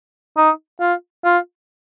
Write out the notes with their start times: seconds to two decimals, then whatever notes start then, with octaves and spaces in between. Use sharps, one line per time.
0.37 D#4
0.81 F4
1.25 F4